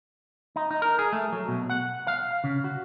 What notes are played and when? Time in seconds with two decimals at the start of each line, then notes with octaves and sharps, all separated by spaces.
0.56 D#4
0.71 D#4
0.82 A#4
0.99 G#4
1.13 A3
1.32 F#3
1.48 B2
1.70 F#5
2.07 F5
2.44 C#3
2.64 F#4